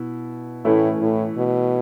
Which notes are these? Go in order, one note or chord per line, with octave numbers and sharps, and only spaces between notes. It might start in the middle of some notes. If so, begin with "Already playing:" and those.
Already playing: B2 E4
A2 E3 A3 C#4 E4
A2
B2